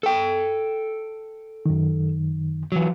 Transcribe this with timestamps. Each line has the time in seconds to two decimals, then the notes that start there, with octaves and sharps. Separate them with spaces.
0.03 A4 G5
1.66 F#2 D#3
2.72 E3 F#3